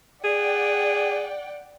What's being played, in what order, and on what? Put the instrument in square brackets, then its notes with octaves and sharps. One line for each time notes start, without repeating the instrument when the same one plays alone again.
[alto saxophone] G#4 [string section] D5 F#5 G5